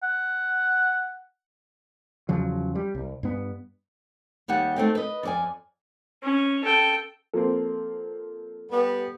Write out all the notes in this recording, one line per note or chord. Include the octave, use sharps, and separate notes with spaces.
F#5
E2 C#3 F3 F#3
G3
C2
G2 B3
D#2 G3 G4 F#5
A3 C4 D#4
B4 D#5
F2 D5 G#5
C#4
A4 G5
F3 A#3 C4 A4
G3 B3